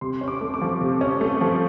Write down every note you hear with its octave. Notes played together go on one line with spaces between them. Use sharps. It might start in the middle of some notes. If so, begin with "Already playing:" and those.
C3 C6
C#4
D6
A3
D6
F3
C3
C#4
A3
F3